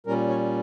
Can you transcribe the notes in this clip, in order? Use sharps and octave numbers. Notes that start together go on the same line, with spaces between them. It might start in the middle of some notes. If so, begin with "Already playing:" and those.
A#2 G3 C#4 A#4
C#5